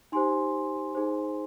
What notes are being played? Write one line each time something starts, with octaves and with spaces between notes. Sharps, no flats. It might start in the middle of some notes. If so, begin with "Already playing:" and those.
D#4 G4 C5 G#5 C6
D#4 G#4 C5